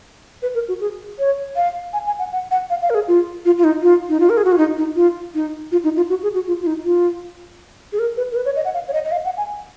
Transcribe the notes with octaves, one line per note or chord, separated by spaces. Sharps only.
B4
A#4
F#4
G#4
C#5
F5
G#5
G#5
F#5
F#5
F#5
F5
F5
A#4
G#4
F4
F4
F4
D#4
F4
D#4
F4
A#4
G#4
F#4
F4
D#4
D#4
F4
D#4
F4
D#4
F4
F#4
G#4
F#4
F4
F4
D#4
F4
G#4
A#4
B4
A#4
B4
C#5
D#5
F#5
F5
C#5
D#5
D#5
F5
F#5
G#5